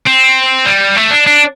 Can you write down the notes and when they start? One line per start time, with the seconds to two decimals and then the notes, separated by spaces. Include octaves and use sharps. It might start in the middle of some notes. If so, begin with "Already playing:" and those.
0.06 C4
0.66 G3
0.97 A3
1.11 D4
1.27 D4